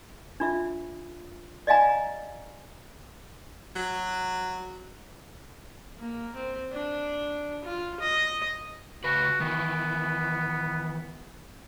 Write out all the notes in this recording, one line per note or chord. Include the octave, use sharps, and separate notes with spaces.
D4 F4 E5
D5 D#5 F5 G#5 A#5
F#3
A#3
C4
D4
F4
D#5
C#3 F#4 B4
D#3 E3 B3